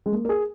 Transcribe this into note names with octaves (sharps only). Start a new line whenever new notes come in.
G#3
A#3
A#4
G#4